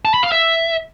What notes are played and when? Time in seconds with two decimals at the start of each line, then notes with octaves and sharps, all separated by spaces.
0.05 A5
0.14 B5
0.23 F5
0.32 E5